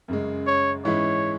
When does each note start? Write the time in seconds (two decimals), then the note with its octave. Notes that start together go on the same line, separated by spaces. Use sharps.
0.08 F#2 C#3 G#3
0.47 C#5
0.85 G#2 E3 G#3 C#4 E4 C#5